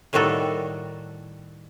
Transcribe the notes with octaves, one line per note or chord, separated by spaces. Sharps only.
A2 D#3 G3 F#4 A4